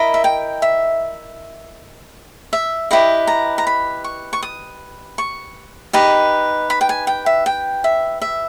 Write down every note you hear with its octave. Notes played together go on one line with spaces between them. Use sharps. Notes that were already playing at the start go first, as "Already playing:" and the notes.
Already playing: E4 A#4 D#5 B5
E5
G5
E5
E5
E4 G4 B4 D#5 G5
A#5
A#5
B5
C#6
C#6
D#6
C#6
D#4 G4 B4 D#5
B5
G5
G#5
G5
E5
G5
E5
E5